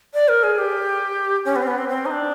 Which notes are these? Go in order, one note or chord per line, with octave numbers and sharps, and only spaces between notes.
D5
A#4
G#4
G4
C#4
B3
C4
B3
C4
C4
D#4
D4